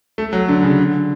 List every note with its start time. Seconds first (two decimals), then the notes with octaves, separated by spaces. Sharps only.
0.18 A3
0.33 F#3
0.48 D3
0.63 C#3
0.79 D3